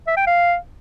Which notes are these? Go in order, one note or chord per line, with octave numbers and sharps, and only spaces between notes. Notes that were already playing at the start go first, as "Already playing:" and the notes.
E5
G5
F5